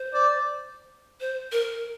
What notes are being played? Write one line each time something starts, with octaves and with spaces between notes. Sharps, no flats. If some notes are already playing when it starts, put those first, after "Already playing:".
Already playing: C5
D5
C5
A#4